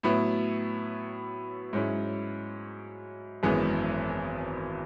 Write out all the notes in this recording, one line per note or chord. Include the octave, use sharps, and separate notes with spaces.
A2 F#3 B3 E4
G#2 F#3 C#4 E4
G#1 F#2 E3 G#3 B3